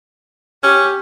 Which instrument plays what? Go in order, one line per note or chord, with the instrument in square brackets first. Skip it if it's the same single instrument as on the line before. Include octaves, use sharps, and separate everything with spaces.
[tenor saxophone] C#4 [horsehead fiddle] G4